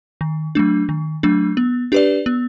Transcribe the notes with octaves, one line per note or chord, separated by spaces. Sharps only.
D#3
F#3 A3 D4
D#3
F#3 A3 D4
B3
D4 G4 B4 D5
B3